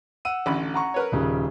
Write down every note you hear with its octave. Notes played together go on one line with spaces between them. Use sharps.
F#5 E6 D#7
A1 D2 B5
F#5 A#5 C#6
A#4 B4 C#5
D#1 C#3